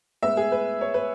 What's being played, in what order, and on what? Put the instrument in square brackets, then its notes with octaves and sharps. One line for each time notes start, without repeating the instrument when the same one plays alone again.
[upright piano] A2 G#3 B3 E5
G#4
B4
C#5
B4